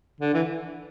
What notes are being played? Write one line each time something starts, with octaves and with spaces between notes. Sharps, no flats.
D3
E3